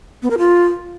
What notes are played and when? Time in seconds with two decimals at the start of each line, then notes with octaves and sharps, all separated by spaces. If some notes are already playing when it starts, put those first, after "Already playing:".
0.23 B3
0.30 A#4
0.38 F4